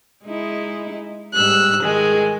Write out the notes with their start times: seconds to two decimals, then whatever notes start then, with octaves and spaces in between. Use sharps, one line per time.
0.25 G#3 D#4 E4
1.34 G#2 G3 E6 F#6
1.82 D#3 G#3 G#4